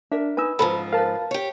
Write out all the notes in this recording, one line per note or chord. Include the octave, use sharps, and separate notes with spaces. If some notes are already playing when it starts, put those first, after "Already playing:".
D4 A#4 E5
D#4 B4 G#5 E6
G#2 C#3 F3 A4 A5 B5
A#4 B4 F5 A5
G4 C#5